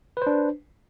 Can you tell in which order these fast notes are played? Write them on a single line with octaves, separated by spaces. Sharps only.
B4 C5 D4